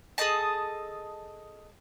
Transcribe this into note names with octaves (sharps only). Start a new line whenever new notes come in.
G#4 A4 D#5 A5